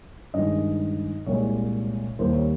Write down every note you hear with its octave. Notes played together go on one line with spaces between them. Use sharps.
G2 D#3 G#3 D#5
C2 A#2 G#3 C#5
D#2 D#3 G3 A#3 C5
C#5